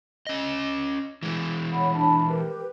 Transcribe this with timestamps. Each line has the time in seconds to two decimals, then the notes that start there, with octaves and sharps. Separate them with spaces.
0.27 C#4 D#5
1.23 E3 G#3
1.71 C#5 F#5 B5
1.94 D4 A5 B5
2.29 G4 A#4 B4